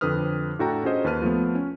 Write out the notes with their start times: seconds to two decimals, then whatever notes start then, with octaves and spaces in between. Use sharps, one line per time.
0.01 F2 D3 C4 B4 D#6 F6
0.59 A2 D4 F#4 A4 G5 A#5
0.84 C#4 F4 F#4 G#4 C5 D#5
1.04 D#2 B4 A5 F6 D#7
1.22 F3 A3 B3
1.55 C#4